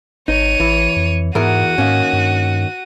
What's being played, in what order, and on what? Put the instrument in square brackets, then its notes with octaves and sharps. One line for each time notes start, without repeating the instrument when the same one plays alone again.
[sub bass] G#1 [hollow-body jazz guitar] D#4 [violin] C#5 D#7
[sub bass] A1 [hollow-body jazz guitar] E3
[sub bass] F2
[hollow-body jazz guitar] E2 A#4 [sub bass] G#2 [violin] F#4 D#7
[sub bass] G#2 [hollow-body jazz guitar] D#3 A#3 C#4
[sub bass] G2